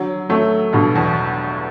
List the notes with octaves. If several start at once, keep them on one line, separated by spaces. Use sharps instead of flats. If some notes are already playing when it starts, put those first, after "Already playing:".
Already playing: D3 F#3
F#3 A3
G2 B2
E2